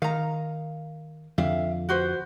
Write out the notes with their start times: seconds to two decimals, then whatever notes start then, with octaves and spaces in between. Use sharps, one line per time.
0.02 D#3 F5 A#5
1.38 F2 D3 E5 F5
1.89 F#4 B4 C5